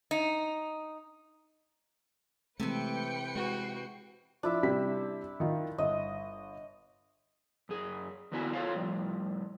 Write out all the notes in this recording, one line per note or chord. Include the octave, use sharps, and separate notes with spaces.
D#4
C3 E3 G#3 A3 B4 G5 C#7
G#3 F#4
F3 D4 E4 E5
C3 G3 B6
D#3 F4
G1 D#5
F#2 G#4
E2 D3 B3 E4 F#4 G#5
F4 A4 C5 C#5 F5
A2 F3 G3